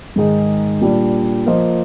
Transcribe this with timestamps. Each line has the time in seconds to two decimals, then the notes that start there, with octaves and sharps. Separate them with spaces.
0.16 G#2 D#3 G#3 D#4 G#4
0.81 A#2 G3 D4
1.46 F3 A#3 F4 C5 D#5